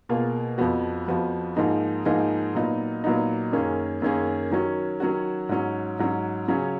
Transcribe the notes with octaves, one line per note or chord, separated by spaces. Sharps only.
B2 A#3 F4 G#4
F2 F3 B3 F#4
F2 F3 B3 F#4
G#2 F3 A#3 D#4 G#4
G#2 F3 A#3 D#4 G#4
A#2 F#3 B3 D#4
A#2 F#3 B3 D#4
F#2 D#3 A#3 C#4 G#4
F#2 D#3 A#3 C#4 G#4
D#3 F#3 C#4 F#4
D#3 F#3 C#4 F#4
G#2 F#3 C#4
G#2 F#3 C#4
C#3 F#3 C#4 G#4